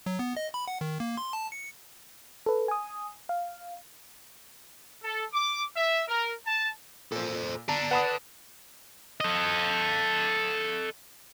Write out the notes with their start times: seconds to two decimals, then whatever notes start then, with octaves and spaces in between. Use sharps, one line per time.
0.06 F#3
0.19 B3
0.37 D#5
0.54 B5
0.68 F#5
0.81 D#3
1.00 A#3
1.17 C6
1.33 A5
1.52 C#7
2.46 A4 B4
2.68 G#5 D#6
3.29 F5
5.04 A4
5.33 D6
5.77 E5
6.08 A#4
6.47 A5
7.12 A#2 A4 C5
7.69 D3 D4 D5 A5 A#5
7.91 B4 F#5 A5 B5 D#6
9.20 A4 D#5